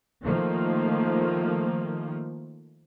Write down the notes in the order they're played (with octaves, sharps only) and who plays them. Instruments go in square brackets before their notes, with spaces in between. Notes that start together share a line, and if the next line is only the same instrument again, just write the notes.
[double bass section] D#3 F3 A3 A#3